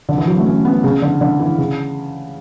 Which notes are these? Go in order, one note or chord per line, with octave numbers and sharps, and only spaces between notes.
D3
E3
F#3
A3
C#4
B3
C#3
D3
D3
E3
C#3